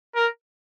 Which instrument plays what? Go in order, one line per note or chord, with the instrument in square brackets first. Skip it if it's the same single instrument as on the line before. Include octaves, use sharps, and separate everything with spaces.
[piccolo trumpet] A#4